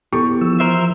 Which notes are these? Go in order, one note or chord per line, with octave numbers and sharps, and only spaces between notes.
E2 G4 A4 C#6
F3 E6
A#4 C5 E5